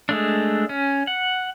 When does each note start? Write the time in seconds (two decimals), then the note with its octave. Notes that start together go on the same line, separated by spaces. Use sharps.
0.09 G#3 A3 D4
0.69 C#4
1.07 F#5